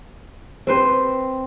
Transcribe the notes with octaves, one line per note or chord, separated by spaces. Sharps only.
C4 B4 C5